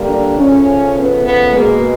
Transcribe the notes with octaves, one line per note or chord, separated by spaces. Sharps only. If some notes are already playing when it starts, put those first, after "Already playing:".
Already playing: D3 G3 A#3
D4
C#3 F3 A3 C#4
B3
B3
B2 G#3 A#3